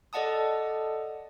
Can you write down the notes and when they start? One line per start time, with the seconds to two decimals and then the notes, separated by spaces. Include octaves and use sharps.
0.13 A4 D5 D#5 F#5 A5 D#6